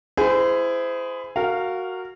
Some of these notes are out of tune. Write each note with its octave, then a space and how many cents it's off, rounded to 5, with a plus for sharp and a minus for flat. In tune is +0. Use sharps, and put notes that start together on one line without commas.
E4 +10 G#4 +0 C5 -25
F#4 +0 A#4 -20 F5 +0